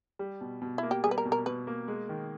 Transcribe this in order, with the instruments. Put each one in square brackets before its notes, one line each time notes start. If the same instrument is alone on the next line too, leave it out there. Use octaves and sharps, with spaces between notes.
[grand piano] G3
B2
B2
[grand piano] A#3 [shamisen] E4
[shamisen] G4
[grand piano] G3 [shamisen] G#4
[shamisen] B4
A#4
[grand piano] B2
[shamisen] A#4
[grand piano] B2 [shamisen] B4
[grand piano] A#3
G#3
D#3